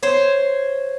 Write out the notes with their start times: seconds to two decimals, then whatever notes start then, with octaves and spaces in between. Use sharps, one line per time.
0.03 C5 C#5